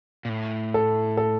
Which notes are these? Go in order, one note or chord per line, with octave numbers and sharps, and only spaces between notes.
A#2
A2
A4
A4